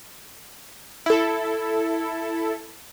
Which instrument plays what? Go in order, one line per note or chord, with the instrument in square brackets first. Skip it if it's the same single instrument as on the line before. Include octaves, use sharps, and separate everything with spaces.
[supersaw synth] E4 A4